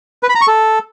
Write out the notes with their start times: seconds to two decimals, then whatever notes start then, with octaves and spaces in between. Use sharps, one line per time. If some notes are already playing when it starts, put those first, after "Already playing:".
0.23 B4
0.29 B5
0.35 A#5
0.41 C#6
0.47 A4